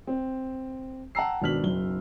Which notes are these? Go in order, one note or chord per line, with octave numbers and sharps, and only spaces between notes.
C4
F#5 G5 A5 A#5 E6 C7
G#1 B2 D4 F6 B6 F#7
F#1 B1 G7